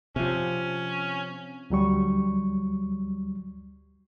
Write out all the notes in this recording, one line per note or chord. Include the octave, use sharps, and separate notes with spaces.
C3 F3 C#4
D2 F#3 G3 C#6